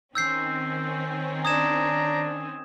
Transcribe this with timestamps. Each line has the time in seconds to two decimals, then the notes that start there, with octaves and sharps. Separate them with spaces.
0.15 D#3 C4 C#4 E6 G6 C7
1.45 D4 A#5 D#6 G#6 E7